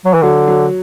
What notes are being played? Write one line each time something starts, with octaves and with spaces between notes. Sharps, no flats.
F#3
E3
D3 F#3
F#3